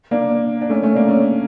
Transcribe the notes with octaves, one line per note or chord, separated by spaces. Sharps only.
A#3 D4
D4
A3 C#4
A3 C#4
A#3 D4
A3 C#4